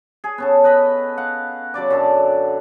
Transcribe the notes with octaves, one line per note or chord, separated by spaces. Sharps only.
G#4
B3 C#4 A4
B4 D#5 B5
F5 F#5
C#3 F#3 D5 D6
F#2 D3 A4